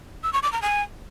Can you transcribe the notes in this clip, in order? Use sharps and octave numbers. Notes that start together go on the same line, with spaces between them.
E6
C#6
D6
A#5
G#5